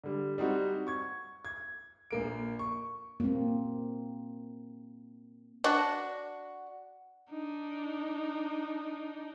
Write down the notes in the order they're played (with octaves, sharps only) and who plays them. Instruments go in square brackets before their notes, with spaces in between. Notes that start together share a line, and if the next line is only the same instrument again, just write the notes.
[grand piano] D3 G3
G3 C4 D#4 F#4
C#6 G#6
G#6
A#1 A#3 D7
C#6
[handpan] A#3 C4
[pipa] D4 F#4
[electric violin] D4 D#4